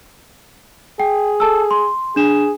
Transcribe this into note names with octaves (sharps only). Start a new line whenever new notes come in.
G#4 G5
A4 A5 E6
C6
D4 G#4 E7